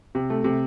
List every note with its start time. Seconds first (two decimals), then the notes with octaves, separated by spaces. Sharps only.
0.15 C3
0.30 A3
0.44 C3